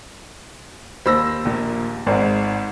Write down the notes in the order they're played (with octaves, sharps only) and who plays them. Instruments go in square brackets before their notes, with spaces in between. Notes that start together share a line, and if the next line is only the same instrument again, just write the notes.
[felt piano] D#2 C5 [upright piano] B5 E6 A#6
[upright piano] A#1 A#2
[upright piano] G#1 [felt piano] G#2